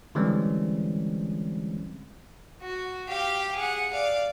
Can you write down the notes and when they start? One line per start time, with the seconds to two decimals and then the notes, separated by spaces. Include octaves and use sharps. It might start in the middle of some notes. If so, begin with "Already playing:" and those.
0.15 D3 E3 G3 G#3 C4 C#4
2.62 F#4
3.08 G4 F5
3.55 G#4 F#5
3.93 D5 F5